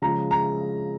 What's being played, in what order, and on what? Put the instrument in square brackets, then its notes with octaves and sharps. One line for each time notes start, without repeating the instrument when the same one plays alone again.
[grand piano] C#3 F3 G#3 A#5
A#5